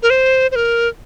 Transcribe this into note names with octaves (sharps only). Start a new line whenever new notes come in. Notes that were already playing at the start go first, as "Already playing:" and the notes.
A#4
C5
C5
A#4